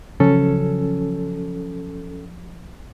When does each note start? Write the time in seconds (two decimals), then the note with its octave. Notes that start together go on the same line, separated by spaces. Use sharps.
0.20 C#3 F3 F#3 C#4 A4